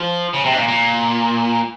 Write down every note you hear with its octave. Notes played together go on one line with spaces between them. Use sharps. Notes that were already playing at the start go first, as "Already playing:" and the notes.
Already playing: F3
C#3
C3
G#2
A#2
A#2